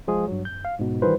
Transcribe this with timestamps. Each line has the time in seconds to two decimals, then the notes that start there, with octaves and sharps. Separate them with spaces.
0.08 F3 G#3 F4 G#4
0.27 G2 F#3
0.45 F#2 G6
0.65 F5
0.79 G#2 B2
1.02 D#3 E3 G3 F4 B4 C5